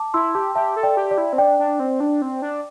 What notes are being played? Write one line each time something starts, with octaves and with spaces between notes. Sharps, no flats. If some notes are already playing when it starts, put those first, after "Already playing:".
Already playing: A5 D6
E4 C6 E6
G4 A5 D6
G4 E5 A5
A4
D5 G5
G4
D5
E4
C4
D4 D5 G5
D4
C4
D4
C4
D4